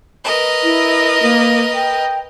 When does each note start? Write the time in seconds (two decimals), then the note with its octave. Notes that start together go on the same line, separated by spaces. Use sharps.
0.24 A#4 B4 D#5
0.63 E4
1.23 A#3
1.74 G5